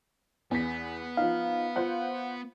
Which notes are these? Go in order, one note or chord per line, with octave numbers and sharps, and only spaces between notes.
E2 B3 B6
F3 D#4 F5
F4 C5 F#5